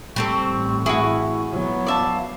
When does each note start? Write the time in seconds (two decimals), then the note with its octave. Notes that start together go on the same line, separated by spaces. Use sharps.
0.16 G3 C4 A4 C#6
0.49 A1 A2
0.86 E4 F#4 G#4
1.52 F#3 B3
1.87 D5 E5 F5 A5